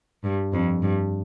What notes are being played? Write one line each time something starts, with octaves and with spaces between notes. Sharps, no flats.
G2
F2
G2